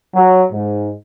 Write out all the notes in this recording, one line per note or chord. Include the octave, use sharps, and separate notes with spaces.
F#3
G#2